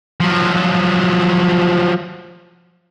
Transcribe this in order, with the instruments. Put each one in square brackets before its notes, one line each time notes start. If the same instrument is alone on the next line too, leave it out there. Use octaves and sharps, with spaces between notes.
[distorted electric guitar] F3 F#3